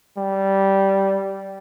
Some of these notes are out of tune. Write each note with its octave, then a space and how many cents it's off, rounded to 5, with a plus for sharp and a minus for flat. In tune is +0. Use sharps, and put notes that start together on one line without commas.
G3 -10